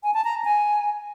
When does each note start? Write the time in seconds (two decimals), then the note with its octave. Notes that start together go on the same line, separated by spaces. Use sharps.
0.03 G#5
0.14 A5
0.24 A#5
0.45 G#5